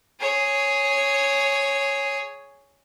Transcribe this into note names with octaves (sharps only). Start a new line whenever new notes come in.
G#4 C#5